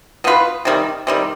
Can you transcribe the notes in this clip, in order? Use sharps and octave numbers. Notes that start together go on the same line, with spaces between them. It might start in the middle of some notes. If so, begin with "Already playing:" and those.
B2 B3 F4 B4
C3 D#3 G3
C3 D#3 G3